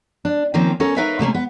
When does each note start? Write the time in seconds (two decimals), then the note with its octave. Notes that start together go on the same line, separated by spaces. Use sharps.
0.25 D4
0.54 D#3 F3 A#3 C4 C#4
0.80 C#4 A4 A#4
0.96 D#4 A#4 B4 C#5 E5 F5
1.19 C3 A3 A#3 C#4
1.34 B3